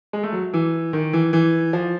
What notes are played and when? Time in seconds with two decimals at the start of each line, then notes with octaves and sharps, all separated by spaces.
0.13 G#3
0.23 A3
0.32 F#3
0.54 E3
0.93 D#3
1.13 E3
1.33 E3
1.73 F3